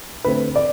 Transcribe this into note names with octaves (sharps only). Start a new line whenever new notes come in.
D3 A3 C4 B4
D5